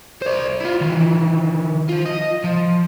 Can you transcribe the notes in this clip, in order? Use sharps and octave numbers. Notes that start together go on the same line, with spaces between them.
C5 D5
E4 F4
D#3 E3
F3 F4
D#5
F3